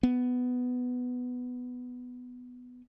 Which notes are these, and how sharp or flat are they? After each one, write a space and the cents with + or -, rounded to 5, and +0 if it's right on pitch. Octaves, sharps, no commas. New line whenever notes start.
B3 +10